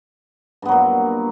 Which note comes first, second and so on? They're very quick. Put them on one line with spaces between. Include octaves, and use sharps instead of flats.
G2 B3 F#3 A#2